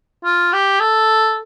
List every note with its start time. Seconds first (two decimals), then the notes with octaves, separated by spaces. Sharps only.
0.25 F4
0.53 G4
0.81 A4